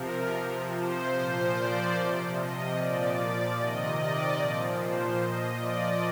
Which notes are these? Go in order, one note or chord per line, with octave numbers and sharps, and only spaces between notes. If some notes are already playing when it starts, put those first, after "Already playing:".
Already playing: C3 F3 A#4
C3 F3
C5
A#2 F3 C5
D5
C3 F3
D#5
A#2 F3 D5
D5
C3 D#3 D#5
D5
A#2 F3
C5
A#2 F3 D#5
D5